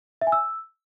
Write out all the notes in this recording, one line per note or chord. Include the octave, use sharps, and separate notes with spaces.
E5
G#5
E6